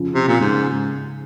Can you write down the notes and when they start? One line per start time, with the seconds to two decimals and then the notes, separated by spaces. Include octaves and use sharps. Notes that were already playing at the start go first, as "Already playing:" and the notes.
Already playing: C#3 F3
0.15 C3
0.28 A#2
0.41 G#2 C#3
0.53 C#3